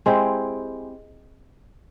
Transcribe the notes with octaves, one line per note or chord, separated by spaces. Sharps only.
G#3 C4 E4 G4